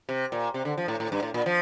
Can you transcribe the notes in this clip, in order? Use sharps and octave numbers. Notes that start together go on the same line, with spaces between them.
C3
A#2
C3
D3
F3
A2
A2
G2
A2
A#2
F3